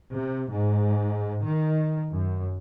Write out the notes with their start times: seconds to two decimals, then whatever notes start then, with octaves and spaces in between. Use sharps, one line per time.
0.15 C3
0.52 G#2
1.45 D#3
2.11 F#2